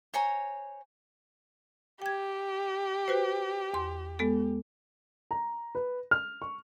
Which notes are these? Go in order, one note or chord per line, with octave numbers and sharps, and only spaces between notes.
C5 C#5 G#5 A#5
G4 G5 G#6
F#4 B4 C5
E2 C6
G#3 B3 A4
A#5
B4
F6
C#6